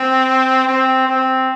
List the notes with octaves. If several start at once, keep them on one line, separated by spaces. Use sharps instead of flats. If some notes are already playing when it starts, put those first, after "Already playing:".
Already playing: C4
C4
C4